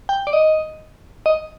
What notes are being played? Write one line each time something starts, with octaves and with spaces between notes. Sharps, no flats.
G5
D5
D#5
D#5